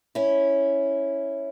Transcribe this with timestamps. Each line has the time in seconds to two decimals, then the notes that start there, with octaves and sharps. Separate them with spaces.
0.15 C#4 E4